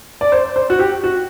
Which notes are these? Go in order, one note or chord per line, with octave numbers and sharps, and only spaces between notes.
D5
C5
C5
F#4
G4
F#4